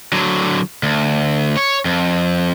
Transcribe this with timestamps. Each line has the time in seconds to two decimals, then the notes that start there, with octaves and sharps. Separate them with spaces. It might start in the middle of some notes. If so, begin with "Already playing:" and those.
0.13 D3 F#3
0.83 D2
1.57 C#5
1.85 F2